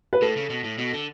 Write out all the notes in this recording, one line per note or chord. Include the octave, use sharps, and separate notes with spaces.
B4
A2 A4
C#3
B2
A2
B2
D3